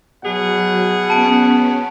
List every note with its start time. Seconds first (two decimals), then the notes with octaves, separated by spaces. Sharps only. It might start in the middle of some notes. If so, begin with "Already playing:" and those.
0.24 B2 F#3 G#4 F#5
1.10 B3 C#4 A5 D7